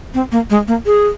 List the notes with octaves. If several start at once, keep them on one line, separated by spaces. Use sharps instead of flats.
C4
A#3
G#3
A#3
G#4